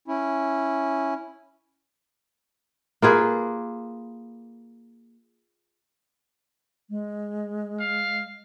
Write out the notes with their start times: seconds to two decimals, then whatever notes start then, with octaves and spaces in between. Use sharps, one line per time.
0.08 C#4 E4
3.02 A#3 F4 G#4 B4
6.90 G#3
7.81 F5